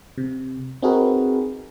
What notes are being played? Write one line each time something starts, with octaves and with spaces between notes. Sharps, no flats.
C3
C4 D#4 F#4 G#4 A#4 B4